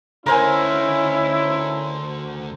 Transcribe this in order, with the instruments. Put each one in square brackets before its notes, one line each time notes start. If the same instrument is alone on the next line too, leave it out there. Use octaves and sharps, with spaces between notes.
[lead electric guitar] D2 D3 [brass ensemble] C#4 D#4 E4 [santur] A#4 C5 G#5